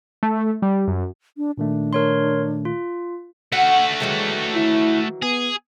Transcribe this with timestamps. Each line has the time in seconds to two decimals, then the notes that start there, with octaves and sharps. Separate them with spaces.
0.23 A3
0.62 G3
0.88 F#2
1.37 D4
1.58 A#2 D#3 A3 D4
1.93 A#4 C#5 C6
2.65 F4
3.52 A3 F#4 F#5
4.00 D#3 E3 F#3 G#3
4.55 E4
5.22 B3 G#4